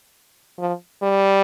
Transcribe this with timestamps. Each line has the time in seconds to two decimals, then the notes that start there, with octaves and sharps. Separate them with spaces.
0.59 F3
1.02 G3